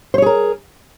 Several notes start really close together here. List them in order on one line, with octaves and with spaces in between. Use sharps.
C5 C#5 G#4 A#4